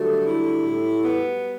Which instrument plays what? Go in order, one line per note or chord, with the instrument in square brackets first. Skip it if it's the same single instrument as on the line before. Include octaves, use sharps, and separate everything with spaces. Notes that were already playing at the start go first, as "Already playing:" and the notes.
Already playing: [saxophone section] D3 A3 [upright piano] F#3 G3
[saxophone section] E4
A2
B3